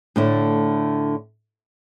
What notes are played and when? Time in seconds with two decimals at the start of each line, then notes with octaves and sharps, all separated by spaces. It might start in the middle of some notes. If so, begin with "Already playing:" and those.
0.16 A2 D3 A3